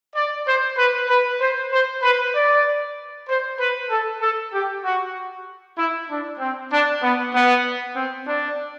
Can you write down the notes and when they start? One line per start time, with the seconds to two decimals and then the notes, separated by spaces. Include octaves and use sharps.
0.15 D5
0.46 C5
0.77 B4
1.08 B4
1.40 C5
1.71 C5
2.02 B4
2.34 D5
3.28 C5
3.59 B4
3.90 A4
4.21 A4
4.53 G4
4.84 F#4
5.77 E4
6.09 D4
6.39 C4
6.72 D4
7.02 B3
7.33 B3
7.96 C4
8.28 D4